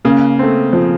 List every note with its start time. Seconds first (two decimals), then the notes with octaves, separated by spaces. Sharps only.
0.04 C#3 A#3
0.39 A3 C4
0.73 F3